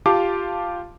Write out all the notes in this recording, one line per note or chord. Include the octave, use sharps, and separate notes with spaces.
F4 G4 F5 A5 D6